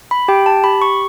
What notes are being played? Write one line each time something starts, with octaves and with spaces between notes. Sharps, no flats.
B5
G4 G5
A5
G4 B5
C#6